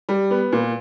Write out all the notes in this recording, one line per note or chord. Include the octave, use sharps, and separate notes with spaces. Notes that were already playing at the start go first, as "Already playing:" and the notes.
G3
B3
A#2